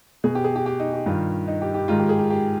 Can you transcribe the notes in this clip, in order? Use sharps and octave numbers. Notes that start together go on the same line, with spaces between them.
B2 G#4
G4
G#4
G4
G4
D#4
G4
G2 D#3 F4
D#4
G4
G4
G#2 D#3 F4
G4
G#4
G4
G4